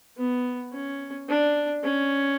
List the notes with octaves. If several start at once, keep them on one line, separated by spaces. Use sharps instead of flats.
B3
C#4
D4
C#4